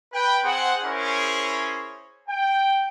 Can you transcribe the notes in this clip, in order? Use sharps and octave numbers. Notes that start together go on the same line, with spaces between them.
B4 G5
C4 G#4 C5 F#5
C#4 E4 G#4 A#4 C5 C#5
G5